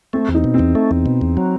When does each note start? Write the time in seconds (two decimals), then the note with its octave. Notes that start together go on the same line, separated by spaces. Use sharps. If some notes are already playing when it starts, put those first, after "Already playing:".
0.13 A3 C4
0.29 E2
0.34 D#4
0.44 B2
0.54 C4
0.59 E2
0.75 A3
0.91 E2
1.06 B2
1.21 E2
1.37 F#3